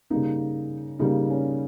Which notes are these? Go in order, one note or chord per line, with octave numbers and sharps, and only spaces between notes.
C#3 G3 A#3 D#4
C#3 G3 A#3 D#4
C#4